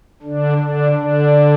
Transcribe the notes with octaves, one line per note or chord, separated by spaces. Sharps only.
D3 D4
D3 D4
D3 D4